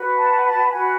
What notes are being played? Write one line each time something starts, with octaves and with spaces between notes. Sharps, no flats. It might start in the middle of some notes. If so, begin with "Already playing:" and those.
Already playing: F#4 B4
A5
A5
F#4 B4 G#5